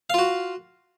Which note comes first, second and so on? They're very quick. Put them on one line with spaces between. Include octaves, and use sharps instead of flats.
F5 F4 F#4